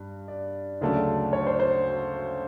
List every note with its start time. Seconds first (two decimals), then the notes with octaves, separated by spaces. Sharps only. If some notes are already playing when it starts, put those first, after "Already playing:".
Already playing: G2
0.28 D5
0.81 D2 C#3 F#3 A3 D4
1.33 C#5
1.47 C5
1.60 C5